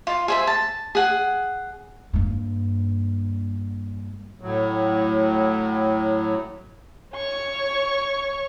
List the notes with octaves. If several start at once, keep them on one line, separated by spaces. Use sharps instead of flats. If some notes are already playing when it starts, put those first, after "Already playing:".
F4
G#4 C5 E5
A5
G#4 F#5
G2 A#3
A2 F#3
C#5 C#6